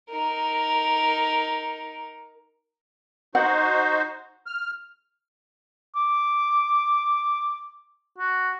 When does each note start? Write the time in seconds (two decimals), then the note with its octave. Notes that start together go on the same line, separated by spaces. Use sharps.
0.10 D#4 A#4
3.35 D#4 F#4 C5 F#5
4.46 F6
5.96 D6
8.18 F#4